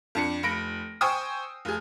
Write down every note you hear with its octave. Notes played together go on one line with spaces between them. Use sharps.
F2 D4 C#7
F1 B5 A#6 D7
C5 G5 G#5 C#6 D#6 E6
F1 G#4